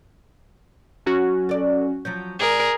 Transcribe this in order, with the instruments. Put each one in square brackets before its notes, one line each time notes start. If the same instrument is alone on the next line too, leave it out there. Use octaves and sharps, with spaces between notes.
[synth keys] F#3 C#4 F#4
[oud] A4 D5
[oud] F3 F#3 C#4 [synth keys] G6
[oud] G#2 [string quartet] G#4 A#4 [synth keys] D5